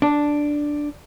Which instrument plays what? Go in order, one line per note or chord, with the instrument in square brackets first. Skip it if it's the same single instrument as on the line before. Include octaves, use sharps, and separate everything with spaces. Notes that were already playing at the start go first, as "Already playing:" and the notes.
[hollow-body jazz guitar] D4